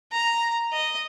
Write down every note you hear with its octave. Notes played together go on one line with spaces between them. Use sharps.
A#5
D#5